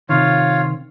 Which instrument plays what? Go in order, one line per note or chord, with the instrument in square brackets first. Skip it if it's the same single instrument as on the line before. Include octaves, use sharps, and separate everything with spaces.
[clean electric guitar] C3 D#3 [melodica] F4 C#5 F5